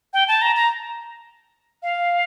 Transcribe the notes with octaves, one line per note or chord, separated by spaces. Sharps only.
G5
A5
A#5
A#5
F5